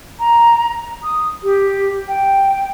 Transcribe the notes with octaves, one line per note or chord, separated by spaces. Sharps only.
A#5
D#6
G4
G5